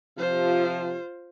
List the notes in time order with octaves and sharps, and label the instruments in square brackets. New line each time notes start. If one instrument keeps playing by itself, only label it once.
[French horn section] C3 F3 [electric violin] F4 C5